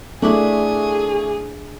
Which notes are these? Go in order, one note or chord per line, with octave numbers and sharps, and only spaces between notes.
A3 D4 E4 G#4 E5 D6